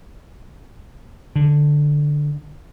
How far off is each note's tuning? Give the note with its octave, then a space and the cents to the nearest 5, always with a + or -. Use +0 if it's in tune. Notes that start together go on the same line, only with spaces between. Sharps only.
D3 +5